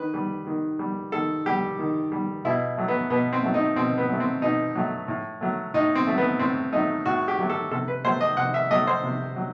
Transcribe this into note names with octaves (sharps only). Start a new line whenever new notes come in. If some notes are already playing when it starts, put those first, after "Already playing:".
Already playing: D#3 B4
G3
D#3
G3
D#3 A4
G3 G4
D#3
G3
B2 E4
F#3 A3
B3
B2 B3
C4
F#3 A3
D#4
B2 C4
B3
F#3 A3
C4
B2 D#4
F#3 A3
A2
F#3 A3
A2 D#4
C4
F#3 A3
B3
A2 C4
F#3 A3 D#4
A2 F#4
G4
F#3 A3
A4
C3 A4
B4
F#3 A3 C5
D#5
C3 F#5
E5
F#3 A3 D#5
C5
C3
F#3